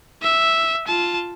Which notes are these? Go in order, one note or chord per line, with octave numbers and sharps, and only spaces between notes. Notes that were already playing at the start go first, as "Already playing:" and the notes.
E5
F4 A5